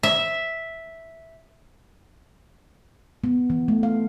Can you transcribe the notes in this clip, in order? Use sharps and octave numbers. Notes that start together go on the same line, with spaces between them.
E5
B3
E3
A3
F5